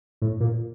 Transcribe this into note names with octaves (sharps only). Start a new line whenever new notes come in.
A2
A#2